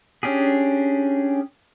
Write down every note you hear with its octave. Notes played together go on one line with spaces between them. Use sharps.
C#4 D4 G4 G#4